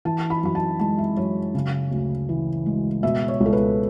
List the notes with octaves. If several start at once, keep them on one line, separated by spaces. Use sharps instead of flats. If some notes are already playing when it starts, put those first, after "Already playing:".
E3 A5
B5
F#2 B5
A5
G#3 A5
E5
F#2 C#5
C#3
D2
E3
G#3
B2 E5
C#5
C#2
A4
B4